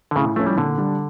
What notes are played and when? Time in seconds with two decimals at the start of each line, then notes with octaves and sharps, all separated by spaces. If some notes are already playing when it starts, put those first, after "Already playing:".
0.11 D3
0.16 A2 C#3
0.36 F3 A3 C#4 E4
0.47 G3
0.57 A#2 D3
0.78 G3 D4